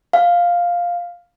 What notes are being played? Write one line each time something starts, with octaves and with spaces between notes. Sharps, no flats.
F5